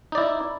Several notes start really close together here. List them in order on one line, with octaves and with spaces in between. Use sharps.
D#4 D5 E4